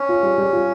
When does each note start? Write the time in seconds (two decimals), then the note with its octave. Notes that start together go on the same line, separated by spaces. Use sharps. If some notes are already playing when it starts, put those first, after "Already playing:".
Already playing: C#4
0.09 F4
0.23 G3
0.38 G3
0.53 F4